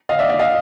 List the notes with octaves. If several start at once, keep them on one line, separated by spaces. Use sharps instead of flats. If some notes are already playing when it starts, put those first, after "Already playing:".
D#5 F5
D5 E5
D5 E5
D#5 F5